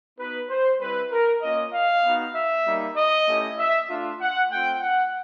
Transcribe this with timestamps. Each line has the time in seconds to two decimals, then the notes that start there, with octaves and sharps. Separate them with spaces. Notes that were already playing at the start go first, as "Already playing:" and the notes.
0.19 B3 D#4 F#4 B4
0.50 C5
0.81 G3 C4 E4 B4
1.12 A#4
1.42 A#3 C#4 F4 D#5
1.73 F5
2.05 B3 D#4 F#4
2.35 E5
2.66 G3 A#3 D#4
2.97 D#5
3.27 A3 C#4 E4 G4
3.59 E5
3.90 A3 D4 F4
4.21 F#5
4.51 A3 C4 F4 G5
4.82 F#5